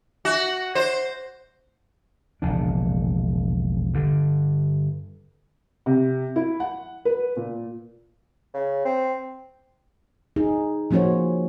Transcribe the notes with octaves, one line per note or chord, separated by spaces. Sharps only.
F#4
C5
E1 A#1 C#3 D4
G2 D3
C3
E4
F#5
B4
A#2
C#3
C4
D#4 G#4
F3 A#3 C#4 F#4 C5 C#5